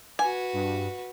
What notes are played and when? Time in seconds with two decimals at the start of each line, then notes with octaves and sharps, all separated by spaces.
0.19 F#4 B4 G#5
0.53 G2